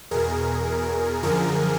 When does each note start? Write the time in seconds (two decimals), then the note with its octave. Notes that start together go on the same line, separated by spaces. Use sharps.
0.11 E2 B2 G#4 A#4
1.23 F#2 D3 F3 G#4 A#4